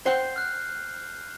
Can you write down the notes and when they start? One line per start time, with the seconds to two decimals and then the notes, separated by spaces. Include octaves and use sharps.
0.06 C5 F#5 G5 G6 C7
0.36 F6 F#6